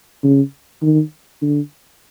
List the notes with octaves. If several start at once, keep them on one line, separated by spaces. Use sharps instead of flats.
C#3
D#3
D3